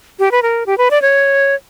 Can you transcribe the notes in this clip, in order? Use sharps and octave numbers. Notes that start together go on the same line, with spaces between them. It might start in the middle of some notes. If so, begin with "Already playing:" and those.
G4
B4
A#4
G4
B4
D5
C#5